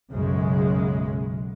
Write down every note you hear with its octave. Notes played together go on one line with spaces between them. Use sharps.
B1 F#2 C#3 G#3